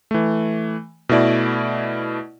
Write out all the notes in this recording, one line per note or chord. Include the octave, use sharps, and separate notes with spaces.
E3 A3
B2 A3 E4 D5